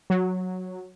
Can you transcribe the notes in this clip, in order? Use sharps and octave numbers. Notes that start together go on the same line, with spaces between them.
F#3